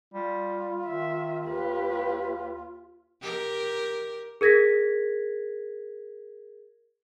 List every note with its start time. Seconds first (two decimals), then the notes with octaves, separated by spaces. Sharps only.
0.14 G3 F4
0.87 D#3 E5
1.47 D#2 G4 B4
3.22 G4 A#4
4.41 G#4 A#4 G#6 A#6 B6